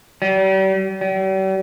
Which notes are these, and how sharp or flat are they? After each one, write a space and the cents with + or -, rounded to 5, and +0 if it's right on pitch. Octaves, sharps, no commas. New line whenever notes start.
G3 -40
G3 -45